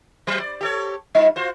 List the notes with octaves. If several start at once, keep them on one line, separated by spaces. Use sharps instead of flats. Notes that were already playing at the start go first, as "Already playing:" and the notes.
F#3 C5
D5
G4 A4 C#5
G3 D#4 F4
F4 F#4 C5